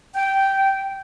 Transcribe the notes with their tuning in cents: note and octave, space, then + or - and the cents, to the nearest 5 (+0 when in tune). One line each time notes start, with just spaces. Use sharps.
G5 -10